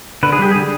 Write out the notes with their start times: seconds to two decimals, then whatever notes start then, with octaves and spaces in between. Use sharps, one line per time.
0.23 D3 B4
0.32 G#4
0.39 G3 G4
0.51 D3 G#4